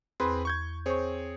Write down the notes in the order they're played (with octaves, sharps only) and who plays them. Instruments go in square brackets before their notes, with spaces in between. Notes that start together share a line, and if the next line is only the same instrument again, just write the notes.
[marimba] E2 B5 C6 [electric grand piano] C4 G#4 B4
[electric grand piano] C#6 G6 G#6
[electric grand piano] C4 G#4 C#5 [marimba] C5 C#6